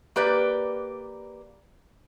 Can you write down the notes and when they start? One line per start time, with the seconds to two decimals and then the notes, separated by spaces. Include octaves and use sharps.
0.16 A#3 G4 B4 D5